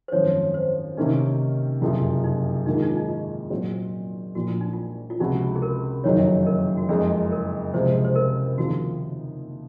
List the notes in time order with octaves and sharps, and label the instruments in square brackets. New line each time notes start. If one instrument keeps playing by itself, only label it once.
[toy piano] C5
[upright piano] G#1 F#2 F3 [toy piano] C#5
[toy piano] C5
[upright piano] C3 D#3 A#3 C#4 [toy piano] D#4
[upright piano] F#1 F2 C3 F3 [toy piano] F4
[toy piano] D#4
[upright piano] G#2 D#3 A#3 [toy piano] D#4
[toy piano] F4
D#4
F4
D#4
F4
[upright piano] A#2 F#3 C4 F#4 C5
[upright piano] A#1 A#2 F3 [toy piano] F#4
[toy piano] F4
D#4
F4
F4
[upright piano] C#2 C3 F3 C4 F#4 [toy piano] D#4
[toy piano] G#4
A#4
[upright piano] F#1 F2 D#3 F#3 [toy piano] C#5
[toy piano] A#4
F#4
[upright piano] F#1 F2 C#3 F3 G#3 [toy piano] G#4
[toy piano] A#4
[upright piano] C#2 C3 F3 G#3 [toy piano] C5
[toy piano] C5
A#4
[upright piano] D#2 C#3 F3 C4 F4 [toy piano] F#4